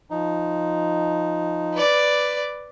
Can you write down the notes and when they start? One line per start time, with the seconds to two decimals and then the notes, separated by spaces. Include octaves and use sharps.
0.11 F3 D#4
1.75 B4 D5